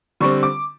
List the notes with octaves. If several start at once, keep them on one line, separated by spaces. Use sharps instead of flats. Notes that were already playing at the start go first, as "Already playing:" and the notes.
D3 G3 C4 C#6
D6